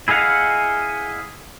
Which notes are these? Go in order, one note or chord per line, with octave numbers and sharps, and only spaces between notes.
E4 G#4 D#5 F5 F#5